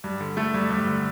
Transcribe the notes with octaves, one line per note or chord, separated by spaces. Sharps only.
G2
D3
A3
G2
G2
D3